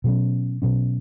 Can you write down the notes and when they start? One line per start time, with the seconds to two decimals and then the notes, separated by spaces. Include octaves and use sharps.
0.04 B2 F#3 C#4
0.62 B2 F#3 C#4